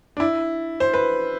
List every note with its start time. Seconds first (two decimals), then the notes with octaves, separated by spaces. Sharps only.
0.17 D4
0.20 E4
0.80 C5
0.94 B4